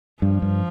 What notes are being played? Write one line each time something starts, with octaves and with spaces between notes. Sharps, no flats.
G2 F3
G2